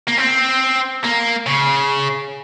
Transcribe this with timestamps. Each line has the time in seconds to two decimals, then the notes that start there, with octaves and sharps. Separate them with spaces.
0.07 A#3
0.17 C4
1.04 A#3
1.46 C#3